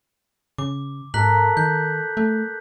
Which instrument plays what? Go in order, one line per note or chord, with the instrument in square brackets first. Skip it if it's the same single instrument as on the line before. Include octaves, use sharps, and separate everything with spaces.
[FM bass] C#3 [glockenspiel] D6
[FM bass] G#2 [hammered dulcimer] A4 A#4 [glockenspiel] F#6 B6 F#7
[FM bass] D#3 [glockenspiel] G6
[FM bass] A3